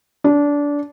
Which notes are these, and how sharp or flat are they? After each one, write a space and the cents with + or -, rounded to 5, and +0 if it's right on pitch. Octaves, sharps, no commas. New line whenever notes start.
D4 -20